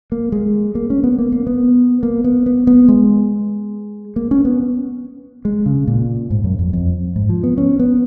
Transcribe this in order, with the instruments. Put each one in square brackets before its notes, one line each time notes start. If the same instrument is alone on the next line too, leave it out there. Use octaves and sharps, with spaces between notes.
[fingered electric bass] A#3
G#3
A#3
C#4
B3
A#3
A#3
B3
A#3
B3
B3
B3
G#3
A#3
C#4
B3
G#3
C#3
A#2
G#2
F#2
F2
F2
G#2
F3
B3
C#4
B3